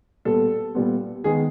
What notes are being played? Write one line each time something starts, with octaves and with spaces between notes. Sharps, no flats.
A#2 G3 B3 A4
A#2 G3 B3
D#3 G#3 B3 G#4